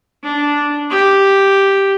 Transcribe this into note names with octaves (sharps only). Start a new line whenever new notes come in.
D4
G4